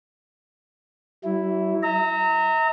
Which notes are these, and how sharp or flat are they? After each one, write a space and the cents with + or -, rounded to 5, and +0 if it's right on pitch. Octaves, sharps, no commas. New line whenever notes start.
F#3 +45 E4 +0
E5 -45 A#5 -25